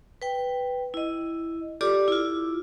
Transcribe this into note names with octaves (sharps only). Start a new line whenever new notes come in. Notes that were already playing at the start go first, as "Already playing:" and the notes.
B4 G5
E4 D#5
F4 G4 A4 D5 D6
E4 F4